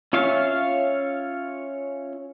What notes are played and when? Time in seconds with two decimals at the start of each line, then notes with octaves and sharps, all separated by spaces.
0.13 C#4 F4 C#5 E5 F5